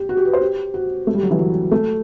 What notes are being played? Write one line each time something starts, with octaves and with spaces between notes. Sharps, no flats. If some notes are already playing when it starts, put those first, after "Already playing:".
Already playing: G4
F#4
G4
B4
C5
G4
F#4
A3
G3
F#3
E3
F#3
A3